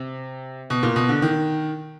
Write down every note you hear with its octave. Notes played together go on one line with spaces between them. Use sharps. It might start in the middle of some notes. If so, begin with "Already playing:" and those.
Already playing: C3
B2
A#2
B2
D3
D#3